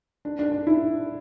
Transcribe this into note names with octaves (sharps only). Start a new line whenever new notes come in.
D4
D4
D4
E4